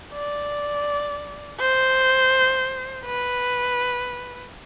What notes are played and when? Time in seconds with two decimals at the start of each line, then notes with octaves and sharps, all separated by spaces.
0.14 D5
1.59 C5
3.06 B4